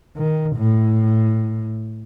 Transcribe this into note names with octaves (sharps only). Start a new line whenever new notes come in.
D#3
A2